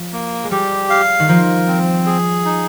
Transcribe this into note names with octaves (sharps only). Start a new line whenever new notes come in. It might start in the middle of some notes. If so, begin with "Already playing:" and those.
Already playing: F3
A#3
G#3
G3 G4
F5
D#3
F3 A#4
C4
G#4
D#4